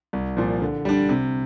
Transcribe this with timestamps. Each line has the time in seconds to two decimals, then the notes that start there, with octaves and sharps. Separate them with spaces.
0.13 C2
0.37 A#2 F3
0.61 D3
0.85 G3 D4
1.09 C3